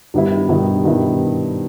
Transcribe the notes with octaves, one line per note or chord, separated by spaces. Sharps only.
G2 D#3 G3 B3 E4
G2 D#3 G3 B3 E4
G2 D#3 G3 B3 E4